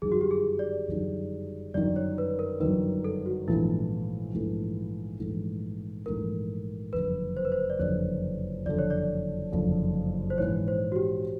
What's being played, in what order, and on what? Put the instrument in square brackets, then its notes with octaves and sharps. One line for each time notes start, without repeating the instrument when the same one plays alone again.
[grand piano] G1 F#2 D#3 [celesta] G#4
[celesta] F#4
G4
G#4
D5
[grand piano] G1 F#2 D#3
[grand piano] G1 F#2 D#3 [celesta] D5
[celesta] C#5
B4
A#4
[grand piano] G1 F#2 D#3 [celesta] B4
[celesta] A4
F#4
[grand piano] A#1 G#2 E3 A3 [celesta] E4
[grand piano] A#1 G#2 E3 A3
A#1 G#2 E3 A3
[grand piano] A#1 G#2 E3 A3 [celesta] A#4
[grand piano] F#1 F2 D3 [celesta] B4
[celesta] C5
B4
C5
D5
[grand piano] F#1 F2 D3 [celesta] C#5
[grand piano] F#1 F2 D3 [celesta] D5
[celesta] C#5
D5
[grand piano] F#1 F2 D3
[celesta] C5
[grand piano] A#1 G#2 E3 [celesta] C#5
[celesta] C5
F#4
G4